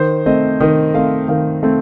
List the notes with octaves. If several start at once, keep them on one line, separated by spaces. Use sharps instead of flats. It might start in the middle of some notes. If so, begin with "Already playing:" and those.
Already playing: D#3 C5
A3 C4 D#5
D#3 D#5
A3 C4 F5
D#3 F5
A3 C4